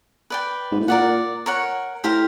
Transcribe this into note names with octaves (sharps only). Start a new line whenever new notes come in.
B4 D5 G5
G#2
A2
A#2 A#4 D5 F#5
A#4 C#5 F#5
A2 G4 C5 F5 A#5